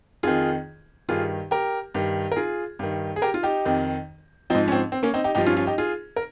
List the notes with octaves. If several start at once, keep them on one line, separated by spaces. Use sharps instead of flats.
F2 D#3 F4 G#4
G2 D#3 F4 G#4
G4 A#4
G2 D#3
A#4
F4 G#4
G2 D#3
G#4
G4 A#4
F4
D#4 G4
F2 D#3
G#2 F3 C4 D#4
C#4
C4
C4
A#3 C#4
C4 D#4
D#4 G4
G2 F3 D#4 G4
C#4 F4
C#4 F4
D#4 G4
F4 G#4
A#4